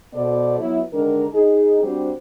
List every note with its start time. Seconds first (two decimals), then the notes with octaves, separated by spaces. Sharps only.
0.13 B2 B3 A4 C5 D5
0.59 F#3 B3 E4
0.92 D3 D#3 G#3 D4 A#4
1.33 D#4 G#4
1.82 G3 C4 D4 F#4 G4 C5